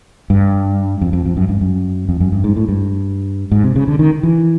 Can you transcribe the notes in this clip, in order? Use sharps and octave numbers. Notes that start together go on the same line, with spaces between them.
G2
F2
F2
F2
F#2
G2
F#2
F2
F#2
G2
G#2
A2
G2
G#2
C3
C#3
D3
D#3
E3